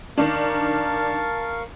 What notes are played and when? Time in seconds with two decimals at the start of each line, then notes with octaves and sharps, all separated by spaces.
0.18 D#3 D4 A#4 F5 A5 C#6